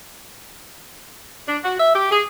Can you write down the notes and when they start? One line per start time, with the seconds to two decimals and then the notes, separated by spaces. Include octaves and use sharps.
1.47 D4
1.63 F#4
1.78 E5
1.94 G4
2.11 G#4